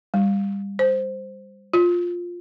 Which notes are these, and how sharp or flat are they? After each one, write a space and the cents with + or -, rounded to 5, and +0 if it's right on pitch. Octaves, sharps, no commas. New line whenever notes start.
G3 +25
C5 +0
F4 +10